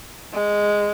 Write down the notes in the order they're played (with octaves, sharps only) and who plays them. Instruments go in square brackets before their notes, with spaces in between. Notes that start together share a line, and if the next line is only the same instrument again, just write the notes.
[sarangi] G#3